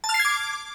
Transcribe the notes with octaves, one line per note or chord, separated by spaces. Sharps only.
A5
F6
C7
G#6
D6